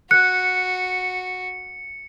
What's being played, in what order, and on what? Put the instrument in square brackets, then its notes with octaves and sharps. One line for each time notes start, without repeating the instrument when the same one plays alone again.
[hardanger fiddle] F#4 [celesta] F#6 [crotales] C#7